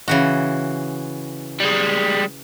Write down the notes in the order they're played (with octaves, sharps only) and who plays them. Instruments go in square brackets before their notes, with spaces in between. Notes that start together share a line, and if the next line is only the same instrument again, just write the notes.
[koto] C#3 E3 F#4
[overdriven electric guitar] G3 G#3